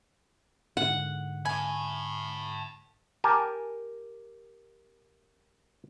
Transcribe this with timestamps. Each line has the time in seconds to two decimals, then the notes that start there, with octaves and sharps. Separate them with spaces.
0.77 G#2 D3 F#5
1.45 G#5 A5 B5
3.24 G4 A#4 G#5 A5